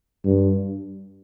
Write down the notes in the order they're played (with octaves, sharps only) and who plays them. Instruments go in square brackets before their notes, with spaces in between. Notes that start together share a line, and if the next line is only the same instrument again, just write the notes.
[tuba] G2